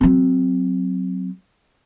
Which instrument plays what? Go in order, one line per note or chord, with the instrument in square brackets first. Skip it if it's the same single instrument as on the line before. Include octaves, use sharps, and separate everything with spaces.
[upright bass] F#3 C4